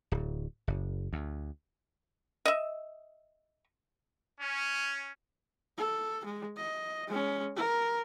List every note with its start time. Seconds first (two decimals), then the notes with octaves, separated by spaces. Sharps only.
0.12 D1
0.67 F#1
1.13 D2
2.45 D#5 E5
4.39 C#4
5.78 A4
6.25 G#3
6.57 D#5
7.08 G#3 C#4
7.56 A#4